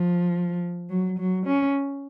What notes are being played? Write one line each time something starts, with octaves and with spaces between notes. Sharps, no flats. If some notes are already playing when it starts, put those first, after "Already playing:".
Already playing: F3
F#3
F#3
C#4